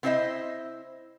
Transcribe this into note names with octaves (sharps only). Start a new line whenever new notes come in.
B3 C4 E4 C5 D#5 E5